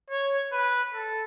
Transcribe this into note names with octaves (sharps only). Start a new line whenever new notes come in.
C#5
B4
A4